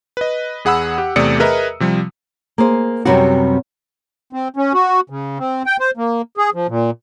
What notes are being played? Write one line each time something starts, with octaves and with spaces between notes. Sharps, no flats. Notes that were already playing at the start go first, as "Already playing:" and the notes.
B4 D#5
E2 G#4 F#5 B5 E6
G4 F#5
E2 C3 A3 D5 D#6 C#7
G#4 A#4 B4 D#5 E5 A#5
C3 F3 G3
A#3 G#4 C5
F#2 C3 G3 B3 C4 F#4
C4
C#4
F#4
C#3
C4
G5
C5
A#3
G#4
F3
A#2